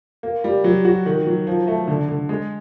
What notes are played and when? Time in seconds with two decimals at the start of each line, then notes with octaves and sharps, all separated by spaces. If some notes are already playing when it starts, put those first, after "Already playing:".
0.23 A#3
0.44 G3
0.64 F#3
0.85 F#4
1.06 D#3
1.27 F#3
1.47 F3
1.68 A3
1.88 D3
2.08 D3
2.29 G#3